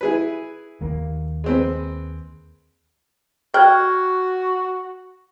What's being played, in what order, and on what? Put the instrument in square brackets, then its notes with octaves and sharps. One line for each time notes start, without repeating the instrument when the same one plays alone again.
[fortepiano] E4 G#4 B4
[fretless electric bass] D#2 A#3
[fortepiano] G#3 C4 B4
[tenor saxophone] F#4 [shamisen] G5 B5 [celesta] F6 F#6 G#6